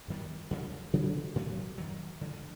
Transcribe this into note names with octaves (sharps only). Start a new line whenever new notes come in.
G2 D#3 G3 B3
F2 C#3 F3
C#3 F#3 B3 D4
A2 F#3 A3
F#2 D#3 F#3
D3 F3 G#3